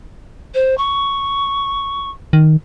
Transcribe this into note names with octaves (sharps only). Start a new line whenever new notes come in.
C5
C#6
D#3